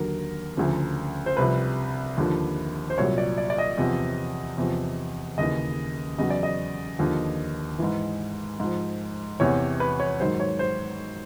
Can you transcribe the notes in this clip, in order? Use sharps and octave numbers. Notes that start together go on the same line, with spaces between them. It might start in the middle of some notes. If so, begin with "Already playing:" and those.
Already playing: D#2 D3 F#3 A#4
D2 C#3 F3
C5
C2 C3 F3 B4
D#2 D3 F3
C5
C2 A#2 F#3 C#5
D5
D5
D5
D#5
E2 C3 F3
E2 C3 F3
D#2 C#3 E3 D#5
E2 C#3 F#3 D#5
D5
D#5
D#2 D3 F3
G#2 E3
G#2 F3
E2 C3 E3 C#5
B4
C#5
G#2 D#3 F#3 C5
C#5
C5